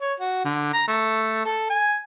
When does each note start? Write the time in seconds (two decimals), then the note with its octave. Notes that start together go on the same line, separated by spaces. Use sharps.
0.01 C#5
0.20 F#4
0.45 D3
0.73 A#5
0.88 A3
1.45 A4
1.70 G#5